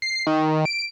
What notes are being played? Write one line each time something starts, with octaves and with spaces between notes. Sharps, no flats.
C7
D#3
D7